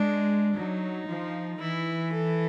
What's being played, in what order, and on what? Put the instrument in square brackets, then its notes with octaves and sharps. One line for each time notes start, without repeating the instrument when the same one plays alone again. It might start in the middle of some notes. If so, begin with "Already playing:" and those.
Already playing: [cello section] G#3 [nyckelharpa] D4
[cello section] F#3 [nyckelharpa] D#4
[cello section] F3
[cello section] E3 [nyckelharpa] E4
[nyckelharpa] A4